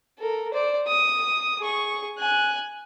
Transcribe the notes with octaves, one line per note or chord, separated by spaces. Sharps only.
A4 A#4
C5 D5
D#6
G#4 C#6
G#5 F#6